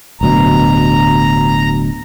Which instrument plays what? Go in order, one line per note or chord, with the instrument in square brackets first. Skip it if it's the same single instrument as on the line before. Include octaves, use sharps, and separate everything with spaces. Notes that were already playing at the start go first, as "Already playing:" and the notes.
[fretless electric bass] D1 D2 B2 [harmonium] A#5